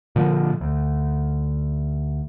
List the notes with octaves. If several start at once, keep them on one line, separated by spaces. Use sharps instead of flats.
A#2 D3 F3
D2